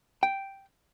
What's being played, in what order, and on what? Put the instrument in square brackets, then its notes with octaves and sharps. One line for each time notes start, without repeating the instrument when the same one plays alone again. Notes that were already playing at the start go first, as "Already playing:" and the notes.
[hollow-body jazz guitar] G5